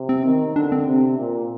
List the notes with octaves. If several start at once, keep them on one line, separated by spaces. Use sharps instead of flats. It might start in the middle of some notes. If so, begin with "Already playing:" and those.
Already playing: C3
C4
D#3
D3 D4
C4
C3
A#2